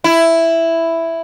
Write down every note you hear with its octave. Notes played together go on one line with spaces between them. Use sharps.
E4